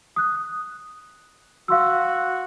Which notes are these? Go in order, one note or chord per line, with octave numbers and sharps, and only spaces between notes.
D#6 F#6
F#4 F5 C6 E6